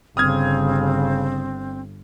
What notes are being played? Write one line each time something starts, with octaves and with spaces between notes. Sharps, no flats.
G1 C#3 C4 D#6 F6 G#6